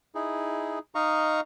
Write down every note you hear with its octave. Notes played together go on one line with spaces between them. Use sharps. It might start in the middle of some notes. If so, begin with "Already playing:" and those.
D#4 E4 G#4
D#4 D#5 F5 A#5 C#6